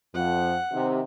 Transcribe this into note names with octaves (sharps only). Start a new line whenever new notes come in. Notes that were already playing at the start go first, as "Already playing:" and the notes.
F2 F#5
C3 D#3